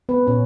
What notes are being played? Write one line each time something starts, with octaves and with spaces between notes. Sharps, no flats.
B3 B4
A#2 C#4 C#5